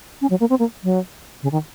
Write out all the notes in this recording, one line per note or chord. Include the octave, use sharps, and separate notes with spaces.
C#4
F#3
A#3
C4
A#3
F#3
C#3
D#3